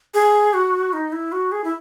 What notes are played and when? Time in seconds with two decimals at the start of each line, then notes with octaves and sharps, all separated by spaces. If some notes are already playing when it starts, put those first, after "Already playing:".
0.14 G#4
0.54 F#4
0.93 D#4
1.12 E4
1.32 F#4
1.52 G#4
1.64 E4